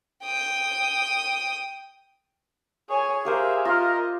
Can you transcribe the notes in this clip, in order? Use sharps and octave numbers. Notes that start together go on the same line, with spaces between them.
G5 D#6
G#4 C#5 G#5
G4 A#4 C5 E5 F5
F4 A#4 D#5